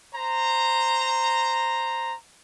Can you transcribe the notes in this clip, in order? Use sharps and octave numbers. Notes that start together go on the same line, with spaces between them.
C5 A#5